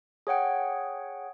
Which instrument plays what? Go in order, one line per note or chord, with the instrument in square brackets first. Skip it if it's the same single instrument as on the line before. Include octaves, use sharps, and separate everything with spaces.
[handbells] G#4 C#5 F#5 G5